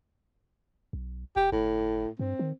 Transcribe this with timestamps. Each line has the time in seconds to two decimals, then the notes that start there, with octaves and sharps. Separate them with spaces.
0.93 B1
1.36 E1 G4
1.52 G1 A2
2.19 G2 C4
2.39 D#3